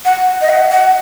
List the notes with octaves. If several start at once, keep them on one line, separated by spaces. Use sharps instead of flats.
F#5
D#5
F#5
F#5